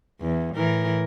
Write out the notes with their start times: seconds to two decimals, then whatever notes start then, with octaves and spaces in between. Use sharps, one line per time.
0.21 E2
0.56 A2 E3 A#4